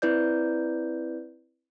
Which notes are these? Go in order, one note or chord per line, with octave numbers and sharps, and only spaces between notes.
C4 E4 B4 D5 G6